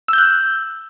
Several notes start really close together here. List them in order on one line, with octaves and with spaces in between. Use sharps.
E6 G6 F#6